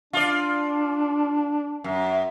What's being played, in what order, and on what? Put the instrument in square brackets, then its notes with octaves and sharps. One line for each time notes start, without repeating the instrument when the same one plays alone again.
[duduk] D4 [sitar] F4 D5
[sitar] F#2